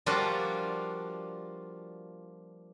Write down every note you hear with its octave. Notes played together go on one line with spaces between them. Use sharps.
F3 G3 A#3 D4 F4 F#4